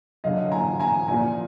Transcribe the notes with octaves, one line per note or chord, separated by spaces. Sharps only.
F#2 D3 F#3 D#5 F5
G#5 A#5
G#5 A#5
A#2 F3 G#5 A#5